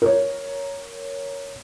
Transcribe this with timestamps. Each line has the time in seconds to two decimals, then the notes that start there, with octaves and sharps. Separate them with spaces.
0.02 A#4 C#5